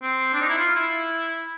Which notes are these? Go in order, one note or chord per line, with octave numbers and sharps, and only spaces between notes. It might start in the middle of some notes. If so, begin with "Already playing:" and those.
C4
D4
D#4
E4
F4
E4